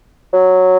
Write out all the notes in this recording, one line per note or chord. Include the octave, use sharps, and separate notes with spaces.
F#3